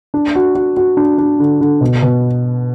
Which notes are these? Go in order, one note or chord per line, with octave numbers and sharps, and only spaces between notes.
D4
F#4
F#4
F#4
D4
D4
D3
D3
B2
B2